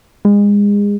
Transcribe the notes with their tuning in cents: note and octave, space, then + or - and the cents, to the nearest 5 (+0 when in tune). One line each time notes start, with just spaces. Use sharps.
G#3 -30